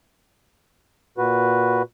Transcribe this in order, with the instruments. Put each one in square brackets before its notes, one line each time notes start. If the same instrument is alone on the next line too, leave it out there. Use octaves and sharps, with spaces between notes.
[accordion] A#2 F#4 B4